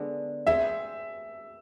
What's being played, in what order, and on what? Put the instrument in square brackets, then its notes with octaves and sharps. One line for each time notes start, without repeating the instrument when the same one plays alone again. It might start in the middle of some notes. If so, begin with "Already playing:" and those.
Already playing: [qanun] D3 G#3 B3 D4
[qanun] G#3 C4 G#4 C5 [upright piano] E5